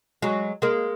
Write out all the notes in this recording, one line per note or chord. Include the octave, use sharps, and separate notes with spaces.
F#3 G#3
G#3 A#3